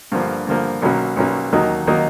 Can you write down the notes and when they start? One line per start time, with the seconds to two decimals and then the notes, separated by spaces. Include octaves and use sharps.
0.12 G2 D3 F3 A#3
0.47 G2 D3 F3 A#3
0.82 B1 B2 F#3 A#3 C#4
1.17 B1 B2 F#3 A#3 C#4
1.53 D#2 D#3 F#3 A#3 D#4
1.87 D#3 F#3 A#3 D#4